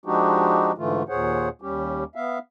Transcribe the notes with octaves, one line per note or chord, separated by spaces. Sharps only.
F3 G#3 D4 D#4 F#4 G4
G#2 D3 E3 A3 F4
D#2 A#2 G#4 C5 C#5 F#5
D#2 G3 C#4 G4
B3 E5 F5